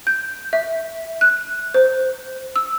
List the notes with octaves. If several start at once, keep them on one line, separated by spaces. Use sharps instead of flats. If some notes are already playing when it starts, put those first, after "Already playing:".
G6
E5
F#6
C5
E6